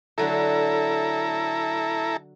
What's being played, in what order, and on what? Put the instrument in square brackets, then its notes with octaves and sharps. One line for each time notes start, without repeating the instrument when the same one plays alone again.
[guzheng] D3 F#3 A3 [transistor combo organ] E4 A4 A#5